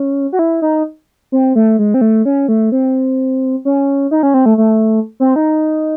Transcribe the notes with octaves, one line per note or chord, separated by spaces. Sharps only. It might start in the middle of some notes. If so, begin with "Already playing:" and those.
Already playing: C#4
F#4
E4
D#4
C4
A3
G#3
C4
A3
C#4
A3
C4
C#4
D#4
C#4
C4
A3
A3
C4
D#4